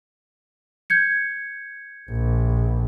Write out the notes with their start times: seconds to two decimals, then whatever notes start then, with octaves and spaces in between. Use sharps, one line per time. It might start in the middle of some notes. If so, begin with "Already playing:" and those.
0.90 G6 G#6 C#7
2.10 A#1